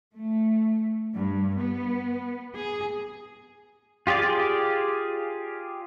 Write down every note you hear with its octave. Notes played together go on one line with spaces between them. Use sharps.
A3
G2
B3
G#4
F4 G4 G#4 D5